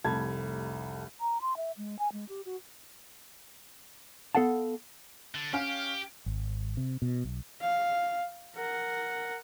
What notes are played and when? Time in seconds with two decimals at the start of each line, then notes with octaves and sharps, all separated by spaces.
0.04 F1 C2 A3 A5 B5 G#6
1.21 A#5
1.41 C6
1.57 E5
1.77 G#3
1.99 G#5
2.12 G#3
2.29 G4
2.45 F#4
4.35 B3 A4 F5 F#5 A5
5.35 D3
5.53 C#4 G4 F5
6.26 G#1
6.77 C3
7.02 B2
7.24 B1
7.61 F5
8.56 A#4 F#5